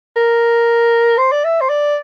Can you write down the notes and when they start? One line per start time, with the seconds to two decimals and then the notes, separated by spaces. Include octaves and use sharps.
0.16 A#4
1.18 C5
1.32 D5
1.45 E5
1.61 C5
1.70 D5